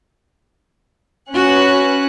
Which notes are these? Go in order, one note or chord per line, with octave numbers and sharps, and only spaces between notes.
C#4 F#4 B4 F#6